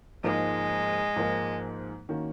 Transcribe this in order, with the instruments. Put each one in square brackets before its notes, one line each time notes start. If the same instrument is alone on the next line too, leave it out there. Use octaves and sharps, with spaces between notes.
[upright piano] G#2 F3 A#3 D#4 A#4 [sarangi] G#3
[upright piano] G#2 F3 A#3 D#4 A#4
D#3 A#3 C#4 F#4